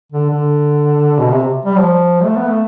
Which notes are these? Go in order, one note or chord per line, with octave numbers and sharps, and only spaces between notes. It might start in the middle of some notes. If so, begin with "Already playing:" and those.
D3
D3
B2
C3
G3
F3
A3
B3
A3